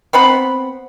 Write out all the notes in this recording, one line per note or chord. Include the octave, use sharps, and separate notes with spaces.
B3 C4 F#5 B5